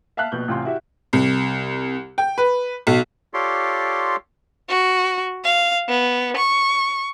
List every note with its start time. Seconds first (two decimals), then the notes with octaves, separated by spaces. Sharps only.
0.17 E5 F5 A5 F6 F#6 B6
0.32 A#1 B2 G6
0.48 A1 C3 F4 G#5 C6
0.65 E4 F#4 G4 E5
1.13 C2
2.18 G5
2.38 B4
2.87 B1
3.34 F4 G4 A4 C#5 D5 C6
4.70 F#4
5.44 F5
5.89 B3
6.37 C#6